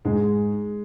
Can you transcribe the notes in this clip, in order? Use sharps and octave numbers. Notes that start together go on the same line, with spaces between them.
G#2 G#3